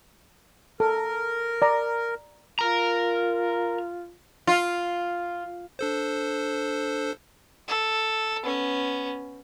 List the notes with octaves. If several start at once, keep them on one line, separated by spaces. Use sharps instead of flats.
A4 A#4
D5 A#5
F4 A#4 A#5
F4
D4 A4 C5
A4
B3 C#4